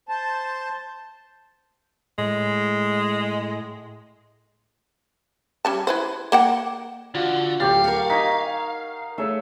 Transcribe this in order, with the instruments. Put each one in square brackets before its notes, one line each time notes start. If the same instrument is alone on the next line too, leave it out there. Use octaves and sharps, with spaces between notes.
[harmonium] C5 A5
[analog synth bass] A2 [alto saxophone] G#3
[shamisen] G3 C#4 A5
E4 B4 C5
A#3 F#5 G5
[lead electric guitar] D3 [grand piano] F4 F#4
[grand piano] D1 A6 [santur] G4 C#5 [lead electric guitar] F5
[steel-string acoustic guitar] A#4 F#5
[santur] D#4 G#5 [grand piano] C#6 B6
[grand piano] A3 G#4 C#5 [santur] E5